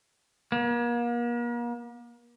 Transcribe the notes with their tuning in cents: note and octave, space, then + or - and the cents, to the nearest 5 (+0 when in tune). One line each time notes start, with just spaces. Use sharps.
A#3 +40